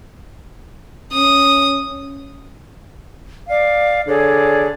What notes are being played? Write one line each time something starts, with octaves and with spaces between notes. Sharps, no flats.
C#4 D#6
D5 F5
D3 G#4 C#5 D5